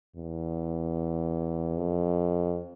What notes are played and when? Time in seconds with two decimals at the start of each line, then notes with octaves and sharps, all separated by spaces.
0.16 E2
1.78 F2